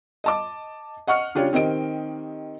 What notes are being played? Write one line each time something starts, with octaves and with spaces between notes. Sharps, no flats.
D#5 A5 D6
D#5 F#5 C#6 F6 C#7
C#3 D4 F4 G4 C#5
D#3 C4 G4 D#5 D7